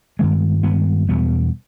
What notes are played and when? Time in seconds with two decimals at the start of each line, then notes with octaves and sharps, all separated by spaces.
0.19 G2 D#3 G#3 B3
0.63 G2 D#3 G#3 B3
1.09 E2 B2 G3 B3